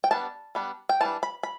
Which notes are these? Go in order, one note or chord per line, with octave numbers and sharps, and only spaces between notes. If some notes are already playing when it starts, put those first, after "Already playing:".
G5
G3 B3 D4 A5
G3 B3 D4
G5
E3 G3 D4 A5
B5
B5